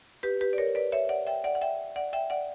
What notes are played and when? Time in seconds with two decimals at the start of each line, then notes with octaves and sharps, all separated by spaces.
0.23 G4 B4
0.41 G4 B4
0.53 D5
0.58 A#4 C#5
0.75 B4 D5
0.92 C#5 E5
1.09 D5 F#5
1.27 E5 G5
1.44 D5 F#5
1.55 F#5
1.61 E5 G5
1.96 D5 F#5
2.13 E5 G5
2.30 D5 F#5